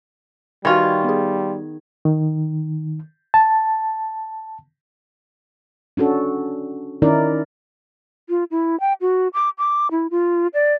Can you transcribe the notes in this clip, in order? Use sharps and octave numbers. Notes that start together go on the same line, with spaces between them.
D#3 E3 G3 F4 F#4 C#6 G#6
B3 G#4
D#3
A5
C#4 D4 F#4 A4
D#3 C#4 D#4 E4 A#4 D5
F4
E4
G5
F#4
D6
D6
E4
F4
D5